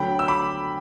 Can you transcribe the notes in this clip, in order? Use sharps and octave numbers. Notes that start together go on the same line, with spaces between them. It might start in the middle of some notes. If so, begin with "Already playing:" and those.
Already playing: D2 D3 F#3 G5 B5
E6
B5 D6